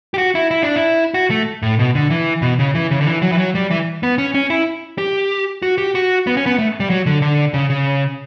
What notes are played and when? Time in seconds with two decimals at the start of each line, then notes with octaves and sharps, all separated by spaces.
0.14 G4
0.18 F#4
0.35 E4
0.51 E4
0.63 D4
0.76 E4
1.14 F#4
1.30 A3
1.62 A2
1.79 B2
1.95 D3
2.10 E3
2.42 B2
2.59 C#3
2.75 E3
2.91 C#3
3.01 D3
3.07 E3
3.22 F#3
3.32 E3
3.38 F#3
3.55 G3
3.71 E3
4.03 B3
4.18 C#4
4.35 C#4
4.50 E4
4.98 G4
5.62 F#4
5.78 G4
5.95 F#4
6.27 B3
6.37 C#4
6.46 B3
6.59 A3
6.80 G3
6.90 F#3
7.06 D3
7.22 D3
7.54 C#3
7.70 C#3